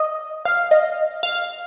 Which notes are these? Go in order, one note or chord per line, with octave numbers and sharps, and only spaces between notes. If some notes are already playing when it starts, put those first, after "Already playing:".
Already playing: D#5
F5
D#5
F5